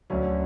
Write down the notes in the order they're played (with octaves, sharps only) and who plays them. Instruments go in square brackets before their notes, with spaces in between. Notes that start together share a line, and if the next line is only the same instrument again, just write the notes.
[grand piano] D2 D3 F#3 C#4